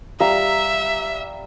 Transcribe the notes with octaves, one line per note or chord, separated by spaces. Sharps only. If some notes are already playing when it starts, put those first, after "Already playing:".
G3 E5 F5 A#5